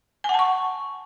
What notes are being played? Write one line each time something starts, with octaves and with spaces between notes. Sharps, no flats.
F#5 G#5 A5 C#6